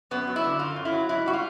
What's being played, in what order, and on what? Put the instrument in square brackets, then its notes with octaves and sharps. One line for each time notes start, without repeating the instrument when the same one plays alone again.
[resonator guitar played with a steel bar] F#2 B3
F#3
E4
D3
F#2 F4
F#2
E4
F#3
G#2 E4
G3 F#4
F4